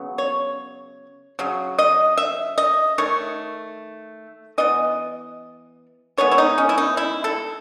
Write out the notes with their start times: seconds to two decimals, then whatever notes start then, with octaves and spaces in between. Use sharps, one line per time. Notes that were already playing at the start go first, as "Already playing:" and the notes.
Already playing: C#3 F#3 B3
0.18 C#5
1.39 C#3 F#3
1.79 D#5
2.17 E5
2.58 D#5
2.98 D#3 A3 C#5
4.58 E3 B3 D#5
6.17 D#3 G#3 B3 C#5
6.31 E4
6.38 D#4
6.58 C#4
6.69 E4
6.78 D#4
6.97 E4
7.24 A4